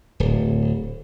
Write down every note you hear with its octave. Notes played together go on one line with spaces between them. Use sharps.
D1